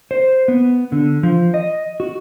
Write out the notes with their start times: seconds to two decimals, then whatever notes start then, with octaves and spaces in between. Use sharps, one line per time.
0.11 C5
0.48 B3
0.92 D3
1.23 F3
1.54 D#5
2.00 F#4